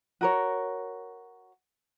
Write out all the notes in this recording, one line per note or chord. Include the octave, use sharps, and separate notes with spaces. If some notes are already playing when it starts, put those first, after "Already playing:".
F#4 A#4 C#5